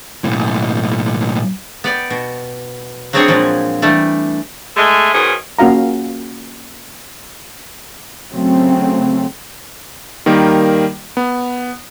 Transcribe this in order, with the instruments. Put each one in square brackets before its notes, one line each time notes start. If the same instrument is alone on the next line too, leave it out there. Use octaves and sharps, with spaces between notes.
[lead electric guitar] B1 A2
[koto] B3 D5 G5
B2
F#3 B3 C4 D4 G#4 C#5
A#2 F3 F#3 G#3
E3 G3 A3 D4
[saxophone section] G#3 A3
G#2 B2 D#3 C#4 G#4
[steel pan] A#3 C#4 F#4 F5 A#5
[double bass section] C#3 F#3 A3 C4
[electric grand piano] D#3 G3 A#3 A#4
B3